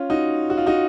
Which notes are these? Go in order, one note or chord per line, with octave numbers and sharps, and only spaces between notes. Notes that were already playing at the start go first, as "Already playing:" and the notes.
Already playing: C#4 F4
D#4 F#4
F#4
F4
D#4 F#4